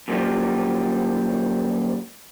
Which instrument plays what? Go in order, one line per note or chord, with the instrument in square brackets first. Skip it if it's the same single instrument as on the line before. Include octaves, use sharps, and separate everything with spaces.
[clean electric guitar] F#2 A#2 D3 F3 G3